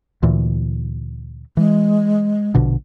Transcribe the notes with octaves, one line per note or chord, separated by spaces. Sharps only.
D2 A#2 E3
E3 G#3
A#1 B2 D3